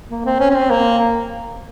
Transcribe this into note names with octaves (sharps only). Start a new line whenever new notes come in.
A#3
C4
C#4
C#4
C4
A#3